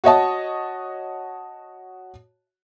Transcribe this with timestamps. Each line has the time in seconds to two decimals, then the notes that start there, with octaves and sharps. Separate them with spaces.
0.04 F#4 C#5 D#5 A5